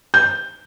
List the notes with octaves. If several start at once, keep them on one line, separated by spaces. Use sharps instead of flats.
G6